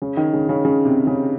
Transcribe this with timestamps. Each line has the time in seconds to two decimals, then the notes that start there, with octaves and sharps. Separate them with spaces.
0.02 C#3
0.17 D#3
0.33 C#3
0.49 C#3
0.65 C#3
0.85 C3
1.07 C#3